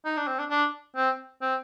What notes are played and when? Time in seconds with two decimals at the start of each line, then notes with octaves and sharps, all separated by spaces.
0.05 D#4
0.17 D4
0.28 C4
0.39 D4
0.50 D4
0.96 C4
1.42 C4